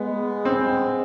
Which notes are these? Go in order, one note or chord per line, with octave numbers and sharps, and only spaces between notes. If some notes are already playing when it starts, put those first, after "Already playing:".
Already playing: G#3 B3
C4